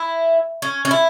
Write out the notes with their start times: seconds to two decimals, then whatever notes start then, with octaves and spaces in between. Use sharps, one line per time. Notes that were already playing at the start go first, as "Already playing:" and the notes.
Already playing: E4
0.62 C#4
0.85 C#4
0.91 E4